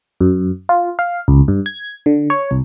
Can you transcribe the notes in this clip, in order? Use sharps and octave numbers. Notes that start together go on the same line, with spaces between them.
F#2
F4
F5
C#2
G2
G#6
D3
C#5
C2